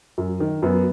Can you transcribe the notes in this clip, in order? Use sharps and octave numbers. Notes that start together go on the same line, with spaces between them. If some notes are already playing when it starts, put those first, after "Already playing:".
F#2
D#3
F#2 B3